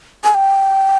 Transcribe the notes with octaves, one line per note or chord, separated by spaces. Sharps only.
G#5
G5